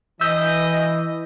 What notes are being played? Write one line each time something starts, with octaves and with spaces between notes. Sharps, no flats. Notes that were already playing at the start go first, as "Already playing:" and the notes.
E3 D#5 E6 G6 B6